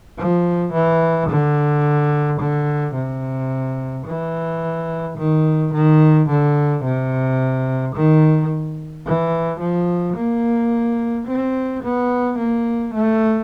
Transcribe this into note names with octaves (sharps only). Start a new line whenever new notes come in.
F3
E3
D3
D3
C3
E3
D#3
D#3
D3
C3
D#3
E3
F3
A#3
C4
B3
A#3
A3